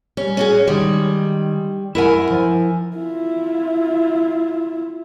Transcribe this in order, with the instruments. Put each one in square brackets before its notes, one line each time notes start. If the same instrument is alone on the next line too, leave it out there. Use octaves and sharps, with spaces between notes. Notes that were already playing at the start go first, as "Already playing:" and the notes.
[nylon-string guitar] G3 [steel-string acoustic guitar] C#4
[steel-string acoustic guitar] C#4 F#4 G#4
[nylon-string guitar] D#3 G#3 [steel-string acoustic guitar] G3
[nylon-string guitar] F#2 F#5 [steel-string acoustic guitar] E4 A#4 G#5
[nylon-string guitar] F3
[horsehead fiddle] E4 F4